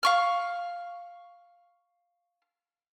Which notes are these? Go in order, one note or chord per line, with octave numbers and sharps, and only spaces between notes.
F5 C#6 F6